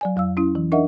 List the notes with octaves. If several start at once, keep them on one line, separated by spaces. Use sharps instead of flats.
F#3 D5 G#5
F2 F#3 F5 E6
C#4 E4
E3
D4 D#4 A#4 D#5 E5 F#5